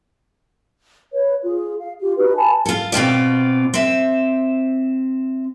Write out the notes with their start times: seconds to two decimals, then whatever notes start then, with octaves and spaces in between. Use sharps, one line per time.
1.13 B4 C#5
1.43 F4 G#4
1.79 F5
2.00 F4 G4
2.17 D#4 F#4 G4 B4
2.36 G#5 A5 B5
2.66 F4 A4
2.92 B2 C4 F4 D5
3.74 C4 E5